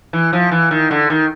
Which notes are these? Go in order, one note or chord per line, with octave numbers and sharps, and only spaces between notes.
E3
F3
E3
D#3
D3
D#3